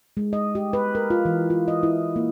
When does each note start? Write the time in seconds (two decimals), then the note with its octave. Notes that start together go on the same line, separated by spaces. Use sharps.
0.17 G#3
0.33 D#5
0.55 G4
0.73 B4
0.95 A#4
1.10 F4
1.25 E3
1.50 F4
1.68 D#5
1.83 E4
2.16 A#3